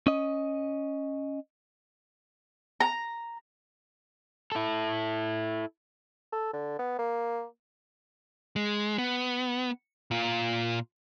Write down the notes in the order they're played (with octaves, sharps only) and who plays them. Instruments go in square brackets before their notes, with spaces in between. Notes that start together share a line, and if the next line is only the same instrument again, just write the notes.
[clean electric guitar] C#4 D#5
[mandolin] A#5
[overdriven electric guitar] E4 A4
[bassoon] A4
D3
B3
A#3
[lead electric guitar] G#3
B3
A#2 F4